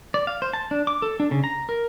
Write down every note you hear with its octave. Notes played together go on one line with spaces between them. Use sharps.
D5
F5
C5
A5
D4
D6
A4
D4
C#3
A#5
A#4